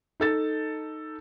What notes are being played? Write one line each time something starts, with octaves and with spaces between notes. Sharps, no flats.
D#4 A4 A6